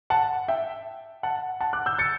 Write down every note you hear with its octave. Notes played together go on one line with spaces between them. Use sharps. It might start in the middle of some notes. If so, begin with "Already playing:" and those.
F#5 A5
E5 G5
F#5 A5
F#5 A5
D6 F#6
E6 G6
A6 C#7